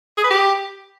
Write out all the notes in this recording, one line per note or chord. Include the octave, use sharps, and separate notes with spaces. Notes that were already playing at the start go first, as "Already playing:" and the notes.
G#4
B4
G4